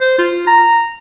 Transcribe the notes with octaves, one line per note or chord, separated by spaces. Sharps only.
C5
F4
A#5